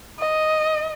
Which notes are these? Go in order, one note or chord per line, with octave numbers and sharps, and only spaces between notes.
D#5